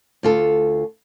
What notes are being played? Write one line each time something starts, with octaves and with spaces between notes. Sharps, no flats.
D2 F4 A4